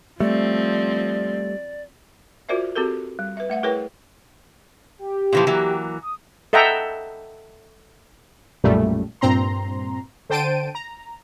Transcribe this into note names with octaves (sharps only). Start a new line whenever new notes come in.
F3 G3 A3 C4 D5
F4 F#4 A#4 C5 D5 E5
C4 F#4 G4 A4 A#4
G3
B4 E5
A3 E5 F#5
E4 G#4 A#4 B4 C#5 G5
G4
A#2 E3 F3
E3 F#3 A#3
D#6
A4 D#5 E5 F#5 G5 A#5
B1 F#2 A#2 G3 A3
G2 A#2 C4 A#5 C6
D3 C5 G5 A5 D7 D#7
A#5